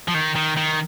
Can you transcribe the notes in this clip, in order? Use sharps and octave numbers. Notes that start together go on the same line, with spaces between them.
F3
D#3
D#3
D#3